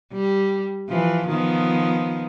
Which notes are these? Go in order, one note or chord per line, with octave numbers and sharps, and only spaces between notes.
G3
E3 F3
D#3 F3 B3